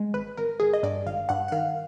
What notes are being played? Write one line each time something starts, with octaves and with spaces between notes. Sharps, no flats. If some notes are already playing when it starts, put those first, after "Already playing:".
Already playing: G#3
G#1 B4
G#1 A#4
G#1 G#4
D#5
G2 D5
G#1 F5
G2 F#5
F#5
D#3 F5